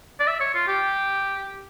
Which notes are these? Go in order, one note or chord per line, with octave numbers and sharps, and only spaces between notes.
D5
E5
C#5
F4
G4